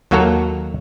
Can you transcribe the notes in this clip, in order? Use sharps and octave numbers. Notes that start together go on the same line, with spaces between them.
D#2 F#3 A#3 F#4 A4 A#5